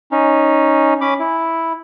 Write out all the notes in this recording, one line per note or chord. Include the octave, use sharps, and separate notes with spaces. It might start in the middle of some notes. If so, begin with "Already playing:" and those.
C#4 D#4
C#4 B5 D6
E4